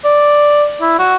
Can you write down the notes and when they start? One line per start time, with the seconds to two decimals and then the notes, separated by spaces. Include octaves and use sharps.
0.05 D5
0.81 E4
0.99 F#4